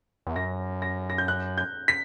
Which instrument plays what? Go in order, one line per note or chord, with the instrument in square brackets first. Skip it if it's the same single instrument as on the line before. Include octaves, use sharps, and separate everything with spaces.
[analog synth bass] E2
[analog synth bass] F#2 [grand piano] A#6
[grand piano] A#6
A#6
G6
F#6
G6
B6